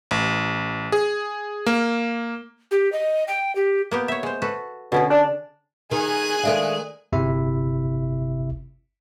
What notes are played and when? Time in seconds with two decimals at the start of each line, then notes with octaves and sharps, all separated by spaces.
0.11 A1
0.92 G#4
1.66 A#3
2.71 G4
2.92 D#5
3.28 G5
3.55 G4
3.91 A#3 B3 G4
4.08 C#5 E5
4.23 G#3 C5
4.42 F#4 A4 B4
4.92 B2 D3 C#4 G#4
5.10 D4
5.91 D#3 G#4 G#5 F#6
6.43 D#3 G#3 D4 A4 E5 F5
7.12 G1 C3 E4 E5